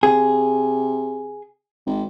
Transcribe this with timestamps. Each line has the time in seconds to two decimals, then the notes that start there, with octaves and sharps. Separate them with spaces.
0.03 C3 G#4
1.86 G#1